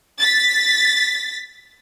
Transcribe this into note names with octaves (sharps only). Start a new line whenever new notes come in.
A6 B6